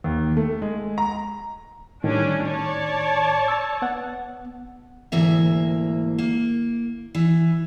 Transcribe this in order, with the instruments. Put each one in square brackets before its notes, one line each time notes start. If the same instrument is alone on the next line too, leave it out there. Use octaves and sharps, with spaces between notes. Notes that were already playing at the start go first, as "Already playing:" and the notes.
[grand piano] D#2
A3
G#3
A#5
[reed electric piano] A2 D#3 [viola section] G3 C#4 D4
[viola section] C#5 D5 A5
[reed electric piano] E6 A6
B3 F#5
[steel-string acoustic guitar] D2 G#2 E3 A#3 E5
A#3
E3